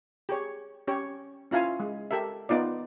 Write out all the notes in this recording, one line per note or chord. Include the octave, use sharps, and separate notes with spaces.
G4 G#4 C#5
C#4 G4 C#5
C#4 E4 F4 F5 G#5
G#3
G4 A4 A#4 E5
B3 D#4 F4 D5